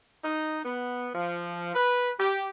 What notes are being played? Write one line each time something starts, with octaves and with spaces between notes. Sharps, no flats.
D#4
B3
F3
B4
G4